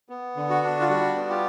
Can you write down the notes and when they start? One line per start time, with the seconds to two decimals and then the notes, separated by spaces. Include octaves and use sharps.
0.09 B3
0.36 D3
0.50 F#4
0.63 D4
0.81 F4
0.89 G3 F#4
1.16 B3
1.30 F4 G4